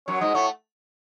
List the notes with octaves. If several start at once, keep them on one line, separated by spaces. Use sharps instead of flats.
F#2 F#3 C#5
G#2 G#3 D#5
A2 A3 C#5